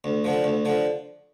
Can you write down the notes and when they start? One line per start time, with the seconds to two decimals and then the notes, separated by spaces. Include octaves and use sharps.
0.04 D2
0.24 D3 F3
0.44 D2
0.65 D3 F3